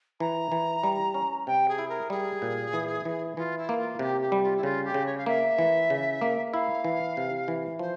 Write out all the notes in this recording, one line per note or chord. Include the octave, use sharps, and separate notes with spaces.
E3 A#5
E3
G3
C#4
C3 G5
G#4
E4
A#4
G3 G#4
A#2
E3
E3
E3 F4
E4
A#3
F4
C3 G4
G4
G3
F4
E4
C#3 F4
G4
C#3
C#5
F5
A#3 E5
E3
C#3
A#3
E4 F5
E3
C3
E3
F3 C5